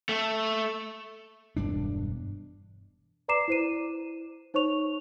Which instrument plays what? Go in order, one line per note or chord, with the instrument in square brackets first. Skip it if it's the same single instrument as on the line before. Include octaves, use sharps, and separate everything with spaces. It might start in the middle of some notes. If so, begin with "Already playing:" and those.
[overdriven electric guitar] A3
[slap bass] E1 G2 D4
[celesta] B4 D5 A#5 D6 C7 E7
E4 C5 D#7
D#4 C5 C#5 C#6 F7